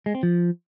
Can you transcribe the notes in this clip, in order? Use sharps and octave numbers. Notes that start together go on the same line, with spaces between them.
G#3
C4
F3